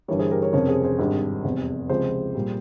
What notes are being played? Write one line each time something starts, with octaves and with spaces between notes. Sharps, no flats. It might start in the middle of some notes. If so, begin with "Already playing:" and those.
G1 G2 E3 G3 A#4 C#5
G#4 C5
G4 A#4
A#4 C#5
F1 F2 C#3 A#4 C#5
G#4 C5
G#4 C5
G#1 G2 G3
F1 E2 C3
C#2 C3 F3 G#3 G#4 C5
A#2 G3